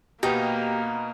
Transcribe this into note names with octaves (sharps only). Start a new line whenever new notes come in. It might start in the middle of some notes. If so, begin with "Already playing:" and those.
B2 A#3 B3 D#4 G4